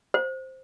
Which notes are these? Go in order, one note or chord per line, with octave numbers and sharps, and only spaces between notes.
C5